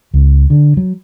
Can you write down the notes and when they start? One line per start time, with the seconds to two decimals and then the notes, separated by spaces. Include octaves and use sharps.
0.14 C#2
0.50 D3
0.77 F#3